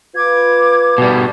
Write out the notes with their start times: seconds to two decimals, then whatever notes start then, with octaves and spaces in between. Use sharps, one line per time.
0.15 F4 B4 D6 G#6
0.98 B2 G3